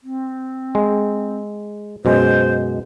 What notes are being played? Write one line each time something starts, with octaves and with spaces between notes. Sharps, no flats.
C4
G#3
F#2 B2 G#3 C5